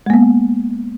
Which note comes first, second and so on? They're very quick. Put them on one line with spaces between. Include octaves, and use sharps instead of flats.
G#3 A#3 B3